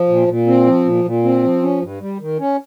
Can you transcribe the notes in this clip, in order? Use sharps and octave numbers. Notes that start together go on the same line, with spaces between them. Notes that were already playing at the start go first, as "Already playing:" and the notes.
Already playing: F3
A#2
A#2
C4
F3
A#2
A#2
C4
F3
C#4
G2
G3
D#3
C#4